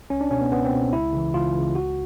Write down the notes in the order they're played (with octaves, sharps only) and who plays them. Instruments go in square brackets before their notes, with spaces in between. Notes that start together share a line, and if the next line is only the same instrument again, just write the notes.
[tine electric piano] C#2 C#4
D4
B2 C#4
B3
C#2 B3
C4
B2
C#2 E4
C#3 E3
C#2 F4
C#3 E3
C#2 F#4